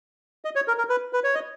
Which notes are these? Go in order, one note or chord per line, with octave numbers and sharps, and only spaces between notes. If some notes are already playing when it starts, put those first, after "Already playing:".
D#5
C#5
A#4
A#4
B4
B4
C#5
D#5